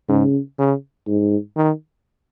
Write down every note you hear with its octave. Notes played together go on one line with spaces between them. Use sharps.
G#2 C#3
C#3
G#2
D#3